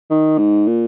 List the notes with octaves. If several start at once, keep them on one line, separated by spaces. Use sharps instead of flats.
D#3
G#2
A#2